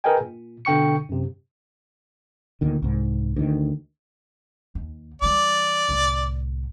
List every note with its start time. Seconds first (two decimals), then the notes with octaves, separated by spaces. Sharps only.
0.04 G#4 A#4 B4 D#5 G5 G#5
0.21 A#2
0.65 B2 D3 G5 C#6 C#7
1.09 F#2 C3
2.61 D2 A#2 D#3
2.82 C2 G#2
3.36 D2 D#3
4.75 D#2
5.22 E3 G3 D5
5.89 C2 A2